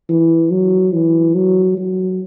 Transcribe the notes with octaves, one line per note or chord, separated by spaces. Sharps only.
E3
F#3
E3
F#3
F#3